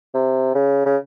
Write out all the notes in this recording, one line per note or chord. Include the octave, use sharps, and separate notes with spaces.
C3
C#3
C#3